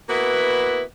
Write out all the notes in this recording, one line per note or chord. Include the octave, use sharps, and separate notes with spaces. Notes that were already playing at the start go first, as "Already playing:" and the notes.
A#3 B3 E4 F#4 B4